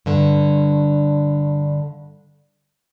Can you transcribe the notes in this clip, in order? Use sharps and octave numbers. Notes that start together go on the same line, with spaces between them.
G2 D3